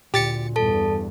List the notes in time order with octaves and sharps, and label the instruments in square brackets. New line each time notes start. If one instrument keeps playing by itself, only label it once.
[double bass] D2 [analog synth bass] A#2 [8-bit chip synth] G4 A6 C#7
[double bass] E2 G2 [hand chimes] A4 A5